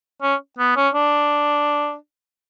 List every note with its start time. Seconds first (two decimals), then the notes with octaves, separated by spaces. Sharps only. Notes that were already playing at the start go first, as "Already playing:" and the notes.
0.22 C#4
0.59 B3
0.76 C#4
0.94 D4